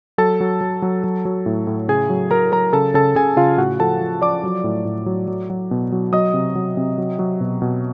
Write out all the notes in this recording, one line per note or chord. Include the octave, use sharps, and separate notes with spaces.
F#3 A4 A5
F#3
F#3
F#3
F#3
F#3
A2
A2
C#3 G#4 G#5
F#3
F#3 A#4 A#5
F#3 A#4 A#5
C#3 A4 A5
C#3 A4 A5
C#3 G#4 G#5
C#3 F4 F5
A2 F#4 F#5
F3 A4 A5
F3
F3 D5 D6
F#3
A2
A2
F#3
F#3
F#3
B2
F#3
F#3 D#5 D#6
C3
F#3
C3
F#3
F#3
B2
B2